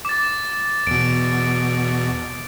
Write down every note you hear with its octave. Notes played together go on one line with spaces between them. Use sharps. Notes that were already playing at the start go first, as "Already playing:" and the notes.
D6 A6
E2 B2 D7